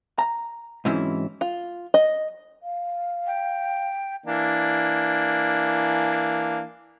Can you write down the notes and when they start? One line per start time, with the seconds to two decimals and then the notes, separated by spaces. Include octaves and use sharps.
0.19 A#5
0.85 G#2 C3 E3 F#3 C#4 E4
1.41 F4
1.94 D#5
2.63 F5
3.27 G5
4.26 E3 A#3 D4